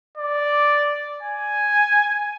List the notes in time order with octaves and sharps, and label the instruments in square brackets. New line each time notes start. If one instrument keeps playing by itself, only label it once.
[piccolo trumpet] D5
G#5